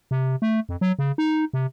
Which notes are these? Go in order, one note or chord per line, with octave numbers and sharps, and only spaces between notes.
C3
A3
F2
F#3
C#3
D#4
C3